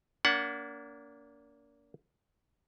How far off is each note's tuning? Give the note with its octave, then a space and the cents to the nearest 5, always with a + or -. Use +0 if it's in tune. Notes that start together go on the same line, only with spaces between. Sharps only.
A#3 +0 D4 -40 F#5 +0